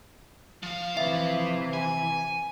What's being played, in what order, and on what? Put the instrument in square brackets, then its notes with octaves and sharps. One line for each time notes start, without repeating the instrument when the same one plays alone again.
[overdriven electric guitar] F3 F5
[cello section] C3 E3 [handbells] E5
[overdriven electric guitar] G#5